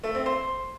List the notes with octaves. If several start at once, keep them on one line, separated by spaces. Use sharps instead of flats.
A3
C4
C5